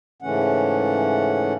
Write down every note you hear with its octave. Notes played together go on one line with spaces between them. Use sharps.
G#2 C#3 E3 A3 C#4 F#5